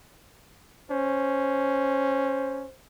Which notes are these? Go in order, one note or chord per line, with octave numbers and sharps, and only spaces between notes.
C#4 C5